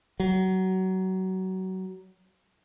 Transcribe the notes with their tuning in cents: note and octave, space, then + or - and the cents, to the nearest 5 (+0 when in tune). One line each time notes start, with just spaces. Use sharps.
F#3 +25